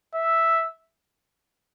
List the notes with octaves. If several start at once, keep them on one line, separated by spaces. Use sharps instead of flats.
E5